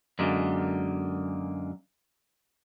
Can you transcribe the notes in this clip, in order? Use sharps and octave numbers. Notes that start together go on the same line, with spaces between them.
F#2 D3 G#3 A#3